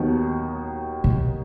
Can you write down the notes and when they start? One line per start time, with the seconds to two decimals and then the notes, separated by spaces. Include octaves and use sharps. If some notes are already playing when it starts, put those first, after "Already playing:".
Already playing: D#2 D#3 F#3 B3
1.04 B2